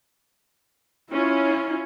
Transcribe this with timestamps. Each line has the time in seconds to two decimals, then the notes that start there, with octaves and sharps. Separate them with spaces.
1.12 C#4 E4 F4